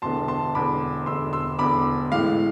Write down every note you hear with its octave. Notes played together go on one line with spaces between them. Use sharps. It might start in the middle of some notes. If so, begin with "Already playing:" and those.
E1 E2 D3 A5 C6
A5 C6
E1 E2 D3 B5 D6
E1 E2 D3 C6 E6
C6 E6
E1 E2 D3 B5 D6
A1 A2 E3 G#3 F5